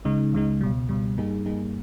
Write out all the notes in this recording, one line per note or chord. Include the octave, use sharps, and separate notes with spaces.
C#2 C#3 G#3 D#4
C#2 C#3 G#3 D#4
C#2 B2 G3
C#2 B2 G3
G2 G3 A#3 D#4 G#4
G2 G3 A#3 D#4 G#4